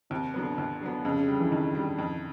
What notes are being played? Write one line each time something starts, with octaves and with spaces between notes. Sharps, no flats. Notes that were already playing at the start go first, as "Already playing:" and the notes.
D#2 C3
D3 F#3 B3
D#2
D3 F#3 B3
F2 C#3
C#3
D3 G3
E3
F2 D#3
D3 G3
F2